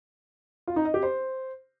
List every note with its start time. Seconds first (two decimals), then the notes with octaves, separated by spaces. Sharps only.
0.67 F4
0.76 D#4
0.85 D#5
0.94 G4
1.03 C5